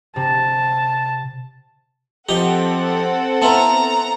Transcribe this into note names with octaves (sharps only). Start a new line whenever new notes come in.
C3 A5
F3 C4 D#4 G4 A4 F#5 A#5
B3 E4 F4 A5 A#5